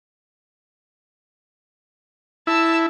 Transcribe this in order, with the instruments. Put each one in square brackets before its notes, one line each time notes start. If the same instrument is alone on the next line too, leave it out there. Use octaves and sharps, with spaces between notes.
[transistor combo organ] E4 [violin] A5 E6